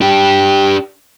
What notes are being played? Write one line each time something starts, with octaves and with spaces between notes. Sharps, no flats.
D4 G4